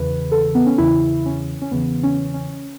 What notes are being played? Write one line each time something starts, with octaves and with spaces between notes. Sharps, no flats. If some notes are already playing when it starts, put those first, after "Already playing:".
Already playing: E2 C#3 E3 B4
A4
B3
C#4
E2 C#3 E3 E4
C#4
C#4
E2 C#3 E3 B3
C#4
C#4